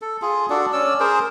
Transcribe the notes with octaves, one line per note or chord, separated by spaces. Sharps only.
A4
F4 G#4
D4 F#4 A4 D5
C#4 D5 E6
G#4 A#4 C5